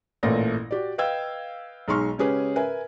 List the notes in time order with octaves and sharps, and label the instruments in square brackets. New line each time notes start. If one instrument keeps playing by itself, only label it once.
[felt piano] A1 A#2 A3 D5 A#6
F#4 G4 D5
B4 D#5 F5 G5 E6 G#6
B1 G#3 D#4 C6 C#6 F6
C#3 G#3 C#4 G4 G#4 B4
A#4 B4 E5 G#5